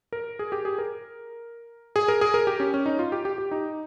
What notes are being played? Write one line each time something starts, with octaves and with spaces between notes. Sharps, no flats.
A#4
G#4
G4
G#4
A#4
G#4
A#4
G#4
A#4
G4
C#4
C#4
D#4
F4
G4
G4
G4
D#4